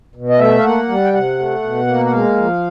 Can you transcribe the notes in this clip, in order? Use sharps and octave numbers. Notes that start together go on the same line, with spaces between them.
B2
D#5
A3 E5
F5
A#3 F#5
G3
G5
C3 F#5
A3
B2
A#3
F#5
G#3 F5
F3